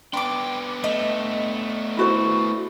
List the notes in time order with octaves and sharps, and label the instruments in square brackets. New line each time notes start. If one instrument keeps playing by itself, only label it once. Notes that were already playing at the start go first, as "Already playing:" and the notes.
[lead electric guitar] B3 D4 [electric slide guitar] G5 [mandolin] C6 D6
[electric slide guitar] A3 [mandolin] D#5
[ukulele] E4 F#4 C5